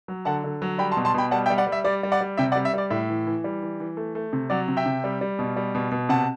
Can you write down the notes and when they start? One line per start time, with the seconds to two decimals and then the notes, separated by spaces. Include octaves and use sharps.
0.08 F#3
0.25 D3 F#5 A5
0.44 D3
0.62 F#3
0.79 G3 G5 B5
0.92 A5 C6
0.97 B2
1.05 A5 C6
1.14 B2 G5 B5
1.31 G3 F#5 A5
1.46 E5 G5
1.50 G3
1.58 D5 F#5
1.67 G3
1.72 E5
1.84 G3 D5
2.03 G3
2.12 D5 F#5
2.21 G3
2.37 C3 E5 G5
2.52 D5 F#5
2.56 G3
2.65 E5
2.73 G3 D5
2.91 A2 E5
3.09 E3
3.27 E3
3.44 G3
3.62 E3
3.80 E3
3.97 A3
4.15 A3
4.33 C3
4.50 F#3 D5 F#5
4.68 C3
4.77 E5 G5
4.86 C3
5.04 G3
5.21 G3
5.39 B2
5.56 G3
5.75 B2
5.92 B2
6.09 C3 F#5 A5